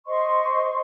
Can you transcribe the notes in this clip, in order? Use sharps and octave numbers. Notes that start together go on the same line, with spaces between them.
C5 D#5 C6 C#6